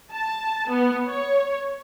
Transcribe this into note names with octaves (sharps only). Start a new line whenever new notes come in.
A5
B3
C#5